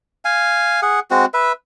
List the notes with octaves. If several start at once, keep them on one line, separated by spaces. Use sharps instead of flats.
F5 G#5
G#4 F#5
G#3 C4 F#4
B4 E5